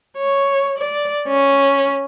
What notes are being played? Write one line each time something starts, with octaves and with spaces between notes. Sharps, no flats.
C#5
D5
C#4